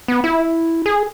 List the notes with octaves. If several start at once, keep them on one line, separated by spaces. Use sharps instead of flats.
B3
E4
G#4